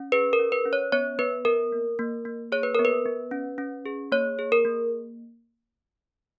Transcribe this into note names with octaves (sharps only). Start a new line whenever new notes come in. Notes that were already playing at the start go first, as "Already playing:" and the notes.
Already playing: C#4
G#4 B4
A#4
C#4
B4
C#4
C#5
B3 C#5
B3 B4
B3 A#4
A#3
A#3
A#3
G#4 C#5
B4
B3 A#4
B4
B3
C#4
C#4
G#4
A#3 C#5
G#4
A#4
A#3